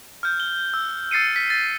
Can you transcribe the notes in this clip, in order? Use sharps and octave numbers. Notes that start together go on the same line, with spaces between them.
F6 G6
G7
E6
E6 A6 C7 C#7 D#7
B6
A6